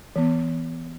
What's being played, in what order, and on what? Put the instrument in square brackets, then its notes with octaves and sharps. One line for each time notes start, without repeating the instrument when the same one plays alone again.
[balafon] E3 B3